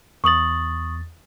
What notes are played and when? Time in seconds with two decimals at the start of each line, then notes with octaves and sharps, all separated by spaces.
0.24 E2 C#6 D#6 A6 F#7